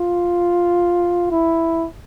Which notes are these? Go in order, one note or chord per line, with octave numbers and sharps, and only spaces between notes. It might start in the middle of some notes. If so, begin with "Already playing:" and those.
Already playing: F4
E4